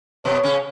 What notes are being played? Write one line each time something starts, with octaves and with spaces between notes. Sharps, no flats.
B2 B3 C#5
C#3 C#4